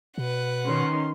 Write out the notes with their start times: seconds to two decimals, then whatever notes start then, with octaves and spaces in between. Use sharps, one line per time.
0.18 B2 B4 F#5
0.66 D#3 C#4 C6